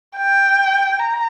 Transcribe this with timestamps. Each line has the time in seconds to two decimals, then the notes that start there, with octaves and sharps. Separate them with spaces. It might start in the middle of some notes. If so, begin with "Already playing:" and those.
0.17 G5
0.99 A#5